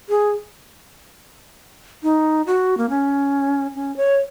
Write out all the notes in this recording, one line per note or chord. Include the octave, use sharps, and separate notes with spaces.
G#4
D#4
F#4
A#3
C#4
C#4
C#5